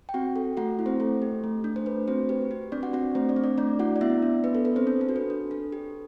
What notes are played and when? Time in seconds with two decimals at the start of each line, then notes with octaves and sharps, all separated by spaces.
0.09 G5
0.14 C4 F#4 F#5
0.36 A4
0.57 A3 F#4 F#5
0.79 E4
0.86 C4 C5
1.00 A3 A4
1.22 G4
1.44 A3
1.64 D4
1.76 C5
1.86 A3 B4
2.08 C4 F#4 C5
2.29 G4 B4
2.51 G4
2.72 C4 D4 D5
2.82 F#4 F#5
2.93 C4 F#4 F#5
3.15 A3 C4 C5
3.29 D4 D5
3.36 C4
3.44 D4 D5
3.58 A3 D4 D5
3.79 E4 F#4 F#5
3.96 D5
4.01 B3 E4 E5
4.22 D4
4.44 B3 B4
4.55 A4
4.65 A4 B4
4.76 C4 C5
4.87 D4 A4
5.01 A4
5.09 F#4
5.16 B4
5.30 D4
5.51 A4
5.72 G4